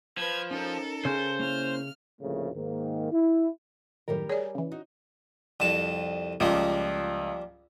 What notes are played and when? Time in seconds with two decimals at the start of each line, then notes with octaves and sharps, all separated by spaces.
0.18 F3 B4 G#6
0.51 C#4 D#4 A4 A#4
1.05 C#3 C5
1.40 A#3 C#4 E4 F6
2.21 D2 A2 C#3 F3 A3 A#3
2.54 G#2 D#3 A#3
3.12 E4
4.08 F#2 A2 D#3 G3 G4 A#4
4.29 G#4 C#5 D5
4.55 C#3 E3
4.71 D#4 F#4
5.60 C2 F2 A5
6.40 C#2 F3 G3 A#3